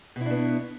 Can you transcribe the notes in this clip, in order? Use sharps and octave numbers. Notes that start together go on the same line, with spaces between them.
B2 B3 D4 E4